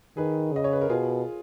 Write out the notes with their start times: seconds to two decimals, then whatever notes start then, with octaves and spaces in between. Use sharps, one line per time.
0.17 D#3 G#4 B4
0.53 C#3 D#5
0.64 C#5
0.73 B4
0.81 A#4
0.89 B2 F4 G#4